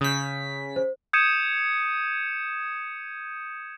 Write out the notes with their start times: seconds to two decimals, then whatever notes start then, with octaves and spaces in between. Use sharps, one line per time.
0.01 C#3 D#6 G6 B6
0.76 C5
1.13 D#6 G6 G#6 C#7 D#7 E7